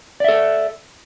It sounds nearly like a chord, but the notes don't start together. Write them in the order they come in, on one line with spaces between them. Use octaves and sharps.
D5 E5 A4